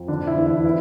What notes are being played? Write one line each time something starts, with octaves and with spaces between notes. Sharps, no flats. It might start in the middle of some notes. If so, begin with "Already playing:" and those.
Already playing: F2
D3 D4
E4
E2
E4
E3 E4